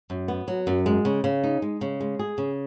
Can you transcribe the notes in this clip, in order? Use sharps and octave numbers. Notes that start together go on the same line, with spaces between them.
F#2
B3
F#3
F#2
G#3
C#3
C#3
D#4
G#3
C#3
G#3
G#4
C#3